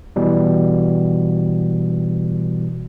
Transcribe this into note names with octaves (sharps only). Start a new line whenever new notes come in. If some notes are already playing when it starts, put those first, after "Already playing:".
B2 E3 G3